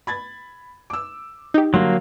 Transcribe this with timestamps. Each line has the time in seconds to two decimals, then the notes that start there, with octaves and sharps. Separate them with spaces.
0.07 B5 G#6 A6
0.90 D6 E6
1.54 D#4 G4
1.74 D3 F#3 G3 A#3 C6